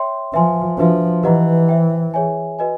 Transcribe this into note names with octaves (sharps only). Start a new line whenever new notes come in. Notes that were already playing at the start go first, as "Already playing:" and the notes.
Already playing: C#5 E5 G5 C6
F3 B4 E5 G#5 C6
F3 D4 F#4 B4 E5
E3 G4 B4 D#5 F#5 A#5
C5 E5 G5
G#4 C#5 E5 G#5
F#4 B4 D#5 G#5